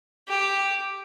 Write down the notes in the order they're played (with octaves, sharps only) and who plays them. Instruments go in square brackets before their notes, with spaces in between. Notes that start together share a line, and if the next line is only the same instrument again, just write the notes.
[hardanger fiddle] G4